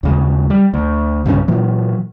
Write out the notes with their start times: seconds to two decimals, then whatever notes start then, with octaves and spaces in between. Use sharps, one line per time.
0.03 D#2 C#3 G#3
0.50 G3
0.74 D2
1.26 B1 G2 C#3 C#4
1.48 A#2 E3 F#3